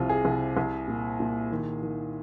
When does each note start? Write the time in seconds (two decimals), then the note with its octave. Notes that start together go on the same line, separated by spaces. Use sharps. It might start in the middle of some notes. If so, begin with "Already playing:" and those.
Already playing: C2 C3 F4
0.09 G#4
0.25 C2
0.57 C2
0.88 A#2
1.20 A#2
1.52 D#3
1.83 D#3